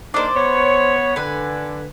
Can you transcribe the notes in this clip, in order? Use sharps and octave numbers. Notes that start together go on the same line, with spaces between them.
A#3 D4 D#4 C5 D5
B3 C#5
D3 B4 G#5